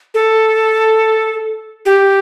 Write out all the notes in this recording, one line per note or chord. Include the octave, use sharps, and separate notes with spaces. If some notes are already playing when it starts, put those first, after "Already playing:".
A4
G4